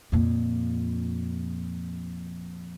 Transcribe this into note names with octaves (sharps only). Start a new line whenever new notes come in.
F2 A#2